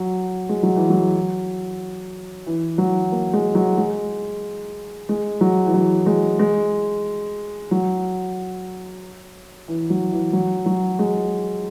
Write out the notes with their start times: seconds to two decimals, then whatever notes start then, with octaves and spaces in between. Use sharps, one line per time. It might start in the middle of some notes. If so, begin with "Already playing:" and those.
Already playing: F#3
0.49 G#3
0.63 F#3
0.76 E3
0.90 F#3
2.46 E3
2.78 F#3
3.12 A#3
3.33 G#3
3.55 F#3
3.78 G#3
5.09 G#3
5.41 F#3
5.67 E3
5.74 F#3
6.06 G#3
6.39 G#3
7.71 F#3
9.68 E3
9.90 F#3
10.12 E3
10.33 F#3
10.66 F#3
10.99 G#3